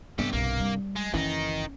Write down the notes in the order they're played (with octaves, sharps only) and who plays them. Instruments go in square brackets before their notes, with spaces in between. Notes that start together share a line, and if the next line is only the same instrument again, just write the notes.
[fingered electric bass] G2 C3 [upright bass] B3 [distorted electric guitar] G4 A4
[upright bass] B1 [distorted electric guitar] A#3
[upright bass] G3
[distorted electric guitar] G#3
[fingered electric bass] F#1 C2 E3 [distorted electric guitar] D#3 D#4 [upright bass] C#4